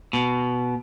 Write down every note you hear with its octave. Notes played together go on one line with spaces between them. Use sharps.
B2